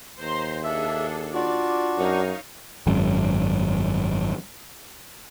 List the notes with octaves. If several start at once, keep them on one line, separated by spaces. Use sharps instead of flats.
D#2 C5 A#5 C6
D4 G#4 A4 E5
D4 F4 F#4 D5
F#2 D#4 C#5 F5
G#1 F#2